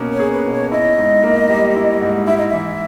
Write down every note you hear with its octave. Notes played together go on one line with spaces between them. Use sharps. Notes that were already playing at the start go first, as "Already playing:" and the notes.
Already playing: B2 A#3 C#4
C#5
G#4
B4
B2
C#5
E4 D#5
G#2
A#3
G3
E4
G#2
E4 E5
D#5
E3 E5